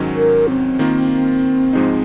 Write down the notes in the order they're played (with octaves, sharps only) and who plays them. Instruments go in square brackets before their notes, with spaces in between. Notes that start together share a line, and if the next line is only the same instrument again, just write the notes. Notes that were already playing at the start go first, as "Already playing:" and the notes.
Already playing: [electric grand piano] G#2 D#3 F#3 C#4
[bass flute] A#4
C4
[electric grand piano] D#3 A#3 F4
G#2 F3 G#3 D#4